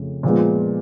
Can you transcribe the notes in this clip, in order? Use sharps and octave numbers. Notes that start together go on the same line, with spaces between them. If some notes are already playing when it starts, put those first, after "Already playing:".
Already playing: F2 C#3 F3 A3
A#2 F3 G#3 B3